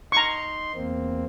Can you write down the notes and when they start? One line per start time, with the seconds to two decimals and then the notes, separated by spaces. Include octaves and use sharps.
0.12 D#4 A#5 C6 C#6
0.75 E2 A#3 C4